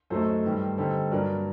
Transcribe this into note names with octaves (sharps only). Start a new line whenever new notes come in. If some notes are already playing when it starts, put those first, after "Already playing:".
F#2 F#3 A3 D#4 A4 C5
G2 D#3 G3
D3 G3 C4 D#4 A4 C5
G2 F#3 A#3 D4 A#4 D5